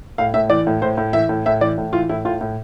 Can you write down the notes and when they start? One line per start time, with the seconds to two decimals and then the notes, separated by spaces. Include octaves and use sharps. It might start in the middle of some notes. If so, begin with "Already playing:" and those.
0.18 A2 F5
0.34 A2 E5
0.50 E3 D5
0.67 A2
0.82 A2 C5
0.97 A2
1.13 E3 E5
1.29 A2
1.46 A2 E5
1.61 E3 D5
1.78 A2
1.93 E3 F4
2.09 A2 E4
2.25 A2 F4
2.41 A2